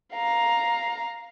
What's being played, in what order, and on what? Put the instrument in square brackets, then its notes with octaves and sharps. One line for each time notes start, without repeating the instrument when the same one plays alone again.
[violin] F5 A#5